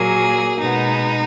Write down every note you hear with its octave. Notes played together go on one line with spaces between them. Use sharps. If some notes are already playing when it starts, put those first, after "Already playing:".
Already playing: A#2 F#3 A#3 G#4
B2 G#3 B3 D#4